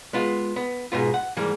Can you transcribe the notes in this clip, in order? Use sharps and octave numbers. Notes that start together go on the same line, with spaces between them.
G#3 B3 F4
B3
G#2 B2 B3 F4
F#5
G#2 E3 G3 A#3